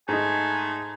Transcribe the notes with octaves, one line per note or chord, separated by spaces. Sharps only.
G#2 A3 D#4 G#5